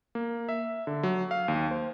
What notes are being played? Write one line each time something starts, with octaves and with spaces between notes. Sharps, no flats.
A#3
E5
D3
F#3
F5
D#2
C5